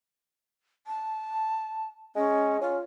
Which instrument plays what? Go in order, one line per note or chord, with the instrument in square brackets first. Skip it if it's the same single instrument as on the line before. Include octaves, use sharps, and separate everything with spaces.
[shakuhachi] A5
[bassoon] G#3 [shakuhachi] C#4
[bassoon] C#4 [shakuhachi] F4